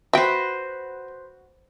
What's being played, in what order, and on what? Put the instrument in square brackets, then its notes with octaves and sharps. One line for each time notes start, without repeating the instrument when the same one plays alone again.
[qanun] F#4 B4 C5 [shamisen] E5 G5